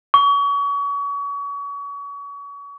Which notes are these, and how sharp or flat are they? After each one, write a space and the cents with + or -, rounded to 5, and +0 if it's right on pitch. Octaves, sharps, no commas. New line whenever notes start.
C#6 +35